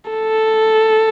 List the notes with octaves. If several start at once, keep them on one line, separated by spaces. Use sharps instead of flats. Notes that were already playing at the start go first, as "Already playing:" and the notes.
A4